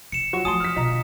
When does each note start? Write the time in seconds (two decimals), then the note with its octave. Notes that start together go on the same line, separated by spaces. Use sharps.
0.12 C#3 C#7 E7
0.33 F#3 F4 F#5 C#6
0.45 F3 A3 G#5 A5 C6 D#6
0.60 F6 B6
0.76 B2 D3 F4 D#5 A#5